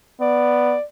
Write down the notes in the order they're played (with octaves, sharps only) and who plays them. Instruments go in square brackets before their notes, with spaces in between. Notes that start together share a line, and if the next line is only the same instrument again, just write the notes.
[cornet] B3 [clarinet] D5